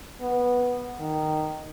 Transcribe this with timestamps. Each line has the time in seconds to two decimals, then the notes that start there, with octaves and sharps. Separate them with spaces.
0.21 B3
1.00 D#3